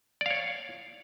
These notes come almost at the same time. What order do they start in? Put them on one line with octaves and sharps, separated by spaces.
D5 F5 C#5